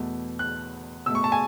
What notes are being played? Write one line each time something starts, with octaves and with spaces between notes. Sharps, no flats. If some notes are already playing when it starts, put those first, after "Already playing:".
Already playing: E2 B2 A3
F#6
B2 A3 C#6 E6
A5
G#5